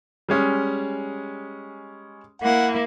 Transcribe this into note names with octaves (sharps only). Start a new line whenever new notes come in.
G3 G#3 C#4
A#3 E4 F#5